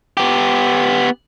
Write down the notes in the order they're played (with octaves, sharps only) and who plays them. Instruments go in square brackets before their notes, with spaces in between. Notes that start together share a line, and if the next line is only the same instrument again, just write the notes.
[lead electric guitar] B3 G4